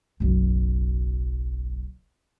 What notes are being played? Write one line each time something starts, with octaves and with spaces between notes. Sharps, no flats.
F#1 B1